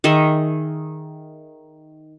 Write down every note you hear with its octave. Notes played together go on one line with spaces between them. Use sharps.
D#3 G#4 D#5 E5